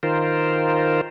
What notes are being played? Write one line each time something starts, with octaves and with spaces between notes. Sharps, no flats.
D#3 F4 A#4 C5